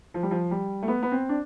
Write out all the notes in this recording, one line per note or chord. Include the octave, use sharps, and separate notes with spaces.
F3
G3
F3
G3
A3
B3
B3
C4
D4